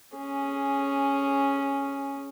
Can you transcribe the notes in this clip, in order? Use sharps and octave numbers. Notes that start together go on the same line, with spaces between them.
C#4 G#4